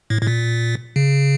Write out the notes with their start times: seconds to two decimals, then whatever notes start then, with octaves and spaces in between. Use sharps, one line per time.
0.10 A2
0.22 A2
0.27 A#2
0.96 C#3